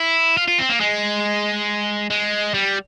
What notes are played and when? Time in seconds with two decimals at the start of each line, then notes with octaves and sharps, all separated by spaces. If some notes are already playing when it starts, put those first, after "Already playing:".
Already playing: E4
0.37 F4
0.48 F4
0.59 C4
0.70 A#3
0.80 G#3
2.10 G#3
2.54 G3